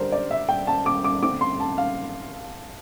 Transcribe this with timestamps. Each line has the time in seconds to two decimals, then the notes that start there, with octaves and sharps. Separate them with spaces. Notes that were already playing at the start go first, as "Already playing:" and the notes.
Already playing: D3 G3 D4 A#4 C5
0.12 D5
0.31 E5
0.49 G5
0.67 A5
0.86 D6
1.04 D6
1.22 D3 A3 C4 D6
1.41 C6
1.60 A5
1.78 F5